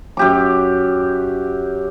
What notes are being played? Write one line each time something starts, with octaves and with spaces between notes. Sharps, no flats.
F#2 G4 D6